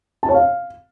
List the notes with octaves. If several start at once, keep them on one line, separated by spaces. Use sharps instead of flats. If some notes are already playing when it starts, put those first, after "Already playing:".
A5
C#5
F5